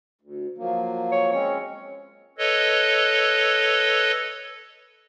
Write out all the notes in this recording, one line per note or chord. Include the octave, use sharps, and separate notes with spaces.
D2
F3 F#3 A#3
C#5
G#3 C4 C#4 C#5
A4 B4 C#5 D#5